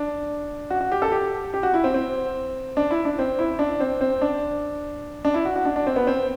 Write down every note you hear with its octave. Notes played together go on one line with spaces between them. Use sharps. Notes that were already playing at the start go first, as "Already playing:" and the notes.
Already playing: D4
F#4
F#4
G4
A4
G4
G4
F#4
E4
C4
C4
D4
E4
D4
C4
E4
D4
C4
C4
D4
D4
E4
F#4
F#4
D4
D4
C4
B3
C4